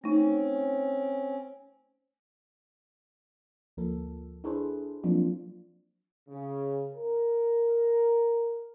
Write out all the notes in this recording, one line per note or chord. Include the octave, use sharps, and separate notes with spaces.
A3 C4 C#4 D#4
D2 F3 A#3 A4
D4 E4 G#4 A4 B4 C5
F3 F#3 A#3 C4 D4 F4
C#3
A#4